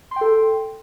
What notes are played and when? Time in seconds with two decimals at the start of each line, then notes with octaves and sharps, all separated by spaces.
0.11 C6
0.16 G5
0.21 A4